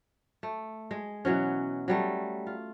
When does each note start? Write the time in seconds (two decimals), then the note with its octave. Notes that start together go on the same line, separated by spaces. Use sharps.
0.43 A3
0.91 G#3
1.25 B2 E3 F#3 C#4
1.88 F#3 G3 A3
2.47 F4